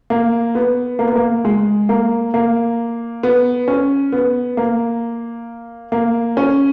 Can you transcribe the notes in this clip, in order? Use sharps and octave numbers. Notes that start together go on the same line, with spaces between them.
A#3
B3
A#3
B3
A#3
G#3
A#3
A#3
B3
C#4
B3
A#3
A#3
C#4